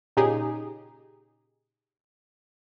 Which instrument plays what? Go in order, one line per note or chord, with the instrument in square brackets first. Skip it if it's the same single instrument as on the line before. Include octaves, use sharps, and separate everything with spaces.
[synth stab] A#2 C#3 D#4 G4 G#4